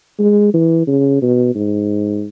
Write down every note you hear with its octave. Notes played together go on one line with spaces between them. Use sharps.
G#3
E3
C#3
B2
G#2